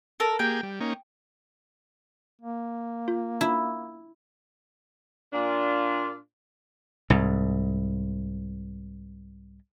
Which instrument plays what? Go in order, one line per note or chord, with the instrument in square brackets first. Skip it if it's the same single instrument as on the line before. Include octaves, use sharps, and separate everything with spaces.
[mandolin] A4 A#4
[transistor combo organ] A#3 G4 G#4 [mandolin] G5
[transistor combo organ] G3
A#3 C#4 D#4
[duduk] A#3
[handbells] F4
[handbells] D4 F4 [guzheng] E4
[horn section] A#2 D4 F4
[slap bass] C2 G#2